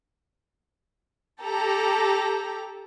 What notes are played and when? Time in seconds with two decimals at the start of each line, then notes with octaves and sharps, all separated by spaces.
1.42 G4 A4 A#5